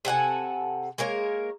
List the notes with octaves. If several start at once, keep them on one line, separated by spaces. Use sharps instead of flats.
C3 A4 F#5 G#5
G#3 A#3 A#4 C#5